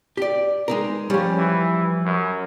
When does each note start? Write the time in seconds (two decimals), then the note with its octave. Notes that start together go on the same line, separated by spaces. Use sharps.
0.17 G4 D5
0.68 G#3 D#4 A#4
1.10 F3 G3 C#4
1.38 E3
2.06 F#2